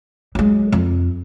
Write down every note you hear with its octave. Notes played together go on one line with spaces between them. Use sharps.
F#3 G#3
F2